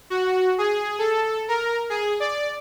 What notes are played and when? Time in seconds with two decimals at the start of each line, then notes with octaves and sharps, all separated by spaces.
0.10 F#4
0.58 G#4
0.99 A4
1.48 A#4
1.90 G#4
2.20 D5